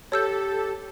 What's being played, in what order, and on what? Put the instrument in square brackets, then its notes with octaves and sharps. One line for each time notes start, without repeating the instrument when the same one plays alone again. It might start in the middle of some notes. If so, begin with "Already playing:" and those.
[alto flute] G4 [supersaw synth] A4 [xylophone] C#5 E6 G6